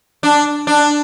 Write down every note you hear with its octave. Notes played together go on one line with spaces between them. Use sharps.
D4
D4